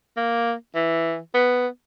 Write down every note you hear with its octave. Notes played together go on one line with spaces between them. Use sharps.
A#3
E3
B3